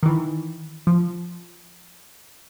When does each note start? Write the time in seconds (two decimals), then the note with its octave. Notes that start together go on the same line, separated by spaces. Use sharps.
0.03 D#3 E3
0.87 F3